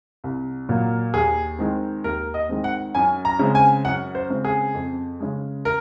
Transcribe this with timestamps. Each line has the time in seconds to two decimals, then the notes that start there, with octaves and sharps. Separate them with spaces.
0.24 C2
0.69 A#2 F#3 A#3
1.14 D#2 G#4
1.59 D#3 G#3 C4
2.04 D#2 A#4
2.34 D#5
2.49 D#3 G#3 C4
2.64 F#5
2.95 F#2 G#5
3.25 A#5
3.39 C#3 G#3 C4
3.55 G#5
3.85 F#2 F#5
4.15 C5
4.30 C#3 G#3 C4
4.45 G#4
4.74 F2
5.20 C#3 G#3
5.65 A#4